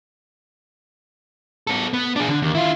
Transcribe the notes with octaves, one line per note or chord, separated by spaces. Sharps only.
B3 A4
B3
D4 G#4
D3
D#2
E4 F4